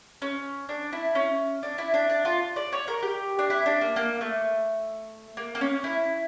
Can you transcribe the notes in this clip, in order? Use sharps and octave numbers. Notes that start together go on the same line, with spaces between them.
C#4
D4
E4
C#4
D4
E4
D4
D4
F4
D5
C#5
A#4
G4
D4
E4
D4
A#3
A#3
A3
A#3
A#3
C#4
E4